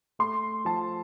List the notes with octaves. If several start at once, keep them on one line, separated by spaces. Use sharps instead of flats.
A3 C6
F3 A5